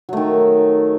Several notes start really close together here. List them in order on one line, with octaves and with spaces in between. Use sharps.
F#3 A3 D#3